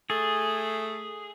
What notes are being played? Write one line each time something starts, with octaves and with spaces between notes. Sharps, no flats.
A3 G#4